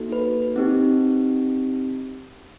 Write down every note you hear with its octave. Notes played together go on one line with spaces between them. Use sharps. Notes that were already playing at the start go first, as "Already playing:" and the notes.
Already playing: A#3 D#4 F#4 A4
B4
C4 D#4 G4